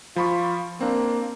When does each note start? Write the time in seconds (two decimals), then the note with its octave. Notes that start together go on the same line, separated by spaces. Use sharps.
0.16 F3 F4 B5 C#6
0.80 A#3 C4 D4